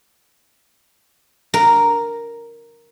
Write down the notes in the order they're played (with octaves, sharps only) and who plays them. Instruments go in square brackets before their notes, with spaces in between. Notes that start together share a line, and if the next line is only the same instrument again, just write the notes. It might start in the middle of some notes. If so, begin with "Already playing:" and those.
[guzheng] A#4